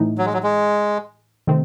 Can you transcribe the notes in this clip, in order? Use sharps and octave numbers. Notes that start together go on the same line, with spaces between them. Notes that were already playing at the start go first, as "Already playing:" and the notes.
Already playing: A2 E3 A3 D#4
F#3
G#3
F#3
G#3
C3 D#3 A3 C4